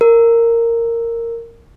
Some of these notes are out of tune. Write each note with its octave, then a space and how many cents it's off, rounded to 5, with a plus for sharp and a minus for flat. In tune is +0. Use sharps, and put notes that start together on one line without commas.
A#4 -10